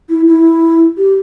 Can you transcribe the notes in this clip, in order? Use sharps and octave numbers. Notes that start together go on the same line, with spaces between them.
E4
E4
G4